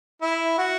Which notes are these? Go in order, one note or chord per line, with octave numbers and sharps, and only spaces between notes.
E4
F#4